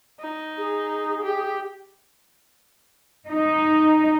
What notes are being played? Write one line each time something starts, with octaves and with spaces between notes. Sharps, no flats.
D#4
G#4
G4
D#4